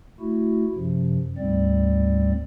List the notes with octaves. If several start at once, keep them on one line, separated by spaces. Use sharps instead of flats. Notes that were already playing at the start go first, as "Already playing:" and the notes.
A3 E4 F#4
F#2 C3 F3
D2 G#2 G3 C4 D5